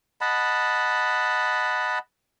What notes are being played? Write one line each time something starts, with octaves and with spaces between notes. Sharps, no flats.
D#5 F#5 A5 B5